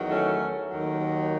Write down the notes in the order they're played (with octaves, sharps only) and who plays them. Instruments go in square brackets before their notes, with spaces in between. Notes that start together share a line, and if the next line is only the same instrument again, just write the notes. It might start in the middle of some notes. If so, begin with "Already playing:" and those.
Already playing: [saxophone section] E2 D#3 F#3
A3 C#4
D#2 D#3 F#3